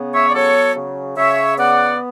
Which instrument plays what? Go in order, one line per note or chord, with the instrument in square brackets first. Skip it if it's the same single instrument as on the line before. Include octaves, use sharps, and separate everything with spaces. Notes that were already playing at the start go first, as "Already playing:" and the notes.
Already playing: [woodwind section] C#3 B3
C#5 E5
D5
F#3 A4 C#5
C#3
C#3 C#5 E5
B3 D5 F#5